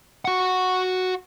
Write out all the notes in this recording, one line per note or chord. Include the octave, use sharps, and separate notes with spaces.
F#4 F#5